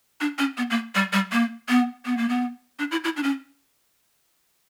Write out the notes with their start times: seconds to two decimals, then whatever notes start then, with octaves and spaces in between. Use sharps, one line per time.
0.21 D4
0.38 C#4
0.57 B3
0.70 A#3
0.95 G3
1.13 G3
1.32 A#3
1.69 B3
2.06 B3
2.17 A#3
2.29 B3
2.79 D4
2.91 E4
3.04 E4
3.17 D4
3.23 C#4